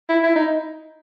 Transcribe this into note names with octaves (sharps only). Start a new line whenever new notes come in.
E4
E4
D#4